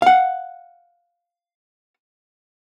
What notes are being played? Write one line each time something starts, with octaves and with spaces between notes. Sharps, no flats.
F5 F#5